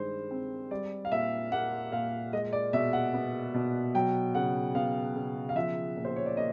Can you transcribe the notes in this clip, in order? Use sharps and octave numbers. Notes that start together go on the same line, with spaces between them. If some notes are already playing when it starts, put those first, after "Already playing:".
Already playing: G2 D#3 G#3 C5
C4
G3 D5
F5
A#2 E5
A#3 F#5
A#2 F5
G#3 D#5
D5
B2 E5
F#5
B3
B2
F#3 G5
C#3 F#5
B3 F5
C#3
F5
F3 E5
A#2
C5
C#5
D5
A#3 D#5